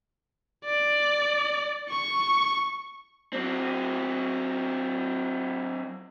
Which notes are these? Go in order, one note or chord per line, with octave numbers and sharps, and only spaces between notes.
D5
C#6
F#3 C4